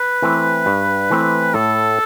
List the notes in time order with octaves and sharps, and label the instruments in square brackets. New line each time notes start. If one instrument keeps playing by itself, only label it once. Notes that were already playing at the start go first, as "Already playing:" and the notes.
Already playing: [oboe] B4
[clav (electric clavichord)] E3 A3 C4
G2
E3 A3 C4
[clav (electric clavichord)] A2 [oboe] A4